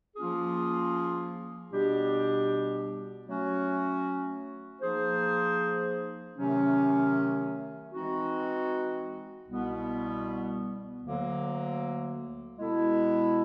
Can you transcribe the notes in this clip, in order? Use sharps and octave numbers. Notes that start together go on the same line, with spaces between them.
F3 A#3 C#4 F4 G#4
B2 G3 B3 D4 G4
F#3 A3 C#4 F#4
F3 A#3 D#4 G#4 C5
C3 D#3 F#3 A3 C#4
E3 G#3 C4 D#4 F#4
C2 B2 G3 B3
D2 D3 F#3 A#3
B2 G#3 B3 E4 A4